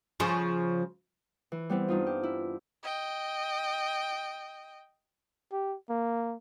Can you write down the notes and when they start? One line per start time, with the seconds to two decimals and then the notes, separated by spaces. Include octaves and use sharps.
0.20 C#3 F3
1.52 E3
1.70 G3 B3 C4 E4
1.88 G2 D#4 F4
2.07 G4
2.23 E4
2.83 D#5 G5
5.52 G4
5.90 A#3